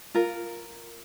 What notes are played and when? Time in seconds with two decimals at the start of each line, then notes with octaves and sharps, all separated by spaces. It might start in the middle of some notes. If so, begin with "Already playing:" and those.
0.14 F4 A#4